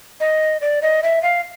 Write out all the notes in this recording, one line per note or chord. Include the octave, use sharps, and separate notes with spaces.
D#5
D5
D#5
E5
F5